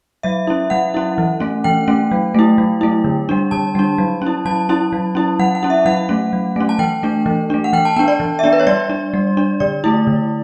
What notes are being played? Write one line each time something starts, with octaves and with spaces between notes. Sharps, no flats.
F#3 E5
C#4 E4
F#3 F#5
C#4 E4
E3
A3 C#4
E3 G5
A3 C#4
F#3
A3 E4
F#3
A3 E4
D3
G3 D4
D3 A5
G3 D4
F#3
C#4 E4
F#3 A5
C#4 E4
F#3
C#4 E4
F#3 F#5
F#5
C#4 E4
E5
F#3 F#5
A3 C#4
F#3
A3 C#4
A5
E3 G5
A3 D4
E3
A3 D4
F#5
E3 G5
A5
B3 D4 G5
D5
E3
E5
B3 D4 D5
B4
C#5
G3 D5
D4
G3
D4
D3 D5
A3 E4
D3